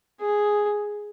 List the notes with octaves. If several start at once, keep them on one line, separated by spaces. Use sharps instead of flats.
G#4